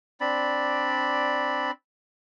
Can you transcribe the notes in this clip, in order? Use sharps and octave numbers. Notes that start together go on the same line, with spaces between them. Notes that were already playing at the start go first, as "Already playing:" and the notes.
C4 D4 D5 B5